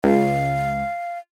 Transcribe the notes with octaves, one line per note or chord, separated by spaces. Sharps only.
C#2 F5